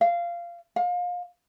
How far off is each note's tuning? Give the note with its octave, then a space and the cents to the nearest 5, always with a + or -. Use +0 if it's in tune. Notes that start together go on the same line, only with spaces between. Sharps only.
F5 -15
F5 +30